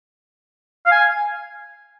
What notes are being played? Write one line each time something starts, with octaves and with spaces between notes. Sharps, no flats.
F5
G#5